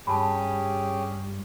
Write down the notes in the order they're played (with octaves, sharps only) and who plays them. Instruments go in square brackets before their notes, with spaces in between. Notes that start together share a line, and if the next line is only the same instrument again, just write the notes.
[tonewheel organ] G2 G3 [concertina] C#4 G4 G#4 [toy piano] A5 B5